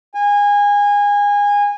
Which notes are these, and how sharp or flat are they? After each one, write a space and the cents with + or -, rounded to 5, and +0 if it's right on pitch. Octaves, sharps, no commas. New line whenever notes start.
G#5 -25